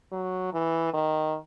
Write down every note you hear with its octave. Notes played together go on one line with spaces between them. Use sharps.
F#3
E3
D#3